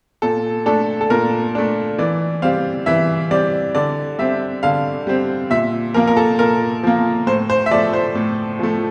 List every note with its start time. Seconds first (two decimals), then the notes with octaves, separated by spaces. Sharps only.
0.22 A#2 A4
0.66 A3 D4 A4
1.01 A4
1.10 A#2 A#4
1.55 A3 D4
1.98 E3 D5
2.42 G3 C4 F5
2.86 E3 E5
3.31 G3 C4 D5
3.75 D3 D5
4.19 G3 C4 E5
4.63 D3 F5
5.07 G3 C4
5.50 A#2 E5
5.94 F3 A#3 A#4
6.07 A#4
6.17 A4
6.39 A#2 A#4
6.83 F3 A#3
7.27 A2 C5
7.50 C5
7.66 E5
7.71 F3 A3 D5
7.93 C5
8.15 A2
8.59 F3 A3